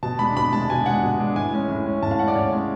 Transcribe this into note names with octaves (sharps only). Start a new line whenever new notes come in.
B2 A5
G#3 D4 B5
B2 B5
G#3 D4 A5
B2 G#5
G#3 D4 F#5
B2
G#3 D4
A2 G#5
G#3 C#4
A2
G#3 C#4
A2 A5
F5
G#3 C#4 F#5
D5
A2 C#5
G#3 C#4